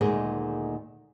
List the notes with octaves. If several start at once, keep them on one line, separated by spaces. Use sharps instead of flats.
D2 A#2 D#3 G#3 G#4